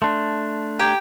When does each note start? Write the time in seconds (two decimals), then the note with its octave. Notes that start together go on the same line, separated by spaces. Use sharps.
0.02 A3 D4 A5 C6
0.79 G4 G5 A#5 G#6